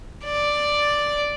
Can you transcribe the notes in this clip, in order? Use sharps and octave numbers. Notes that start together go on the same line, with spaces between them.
D5